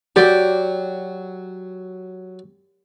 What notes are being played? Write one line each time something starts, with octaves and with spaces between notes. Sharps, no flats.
F#3 G4 D5